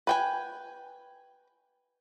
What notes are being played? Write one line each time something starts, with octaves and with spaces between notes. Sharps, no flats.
B4 G5 G#5